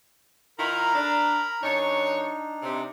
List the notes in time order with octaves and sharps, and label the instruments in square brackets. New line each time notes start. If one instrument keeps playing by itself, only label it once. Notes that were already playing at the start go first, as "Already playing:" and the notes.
[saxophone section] D#3 E4 F4 [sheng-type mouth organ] A#4 A#5 B5
[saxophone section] D4
[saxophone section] F#2 C#5 [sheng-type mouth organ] D4 D#4
[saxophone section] C3